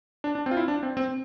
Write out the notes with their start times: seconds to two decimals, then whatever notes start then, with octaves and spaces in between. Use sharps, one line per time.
0.24 D4
0.35 D4
0.46 C4
0.51 F4
0.57 E4
0.68 D4
0.83 C4
0.97 C4